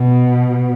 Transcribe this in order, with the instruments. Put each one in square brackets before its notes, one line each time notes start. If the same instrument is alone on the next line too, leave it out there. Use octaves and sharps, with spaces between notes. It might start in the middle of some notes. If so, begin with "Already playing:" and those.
Already playing: [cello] B2